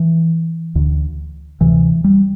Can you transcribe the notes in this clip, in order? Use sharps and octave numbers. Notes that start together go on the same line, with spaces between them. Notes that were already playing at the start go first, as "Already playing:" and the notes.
Already playing: E3
D2 D3
D2 C3 E3
G3